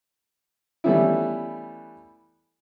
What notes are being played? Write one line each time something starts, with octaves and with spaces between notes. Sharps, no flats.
E3 G3 A3 B3 C#4 E4